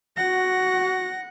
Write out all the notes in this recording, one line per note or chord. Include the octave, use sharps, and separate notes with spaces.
F#4 F#5 A#6